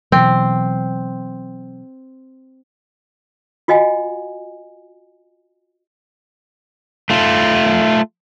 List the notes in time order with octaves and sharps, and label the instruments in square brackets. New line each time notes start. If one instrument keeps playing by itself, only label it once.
[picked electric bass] B2 E3 F#3 [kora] C4
[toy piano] F4 F#4 D#5 F#5 G#5
[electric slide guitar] A3 F4